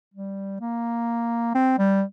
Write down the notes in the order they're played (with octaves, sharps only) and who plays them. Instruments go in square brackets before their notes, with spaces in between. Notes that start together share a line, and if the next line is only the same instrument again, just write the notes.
[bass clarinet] G3
A#3
C4
G3